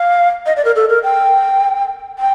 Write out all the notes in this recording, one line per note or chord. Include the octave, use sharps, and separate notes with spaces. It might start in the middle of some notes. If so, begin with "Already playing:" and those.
Already playing: F5
D#5
D5
A#4
A4
A#4
G5
G5